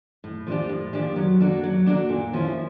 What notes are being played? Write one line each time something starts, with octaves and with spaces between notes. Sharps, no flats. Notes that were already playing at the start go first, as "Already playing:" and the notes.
A2
F3 A#3 D4 G4
A2
F3 A#3 D4 G4
F#3
A#3 D4 F#4 A4
F#3
A#3 D4 F#4 A4
A#2
F3 A#3 C#4 E4